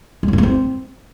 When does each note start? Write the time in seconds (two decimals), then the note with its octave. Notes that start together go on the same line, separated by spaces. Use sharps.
0.23 G#3
0.28 C#3
0.33 F#2
0.38 A3
0.43 C4